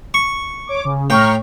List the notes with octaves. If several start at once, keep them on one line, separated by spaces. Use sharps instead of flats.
C#6
C#5 D6
C#3
A2 G5 A#5 C#6 F6